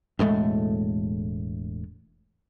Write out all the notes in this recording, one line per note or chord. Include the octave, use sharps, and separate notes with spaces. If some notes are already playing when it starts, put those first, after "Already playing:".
E1 A2 G#3 A3